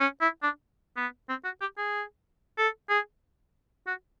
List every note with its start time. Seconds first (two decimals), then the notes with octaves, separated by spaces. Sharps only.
0.01 C#4
0.21 E4
0.43 D4
0.97 B3
1.29 C4
1.45 F#4
1.61 G4
1.78 G#4
2.58 A4
2.89 G#4
3.87 F#4